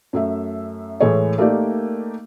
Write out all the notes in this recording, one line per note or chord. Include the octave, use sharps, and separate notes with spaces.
F#2 A3 E5
A2 E3 G#3 A4 C#5
A3 A#3 D#4 G4 A#4 D5